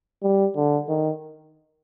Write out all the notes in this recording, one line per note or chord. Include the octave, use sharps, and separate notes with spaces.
G3
D3
D#3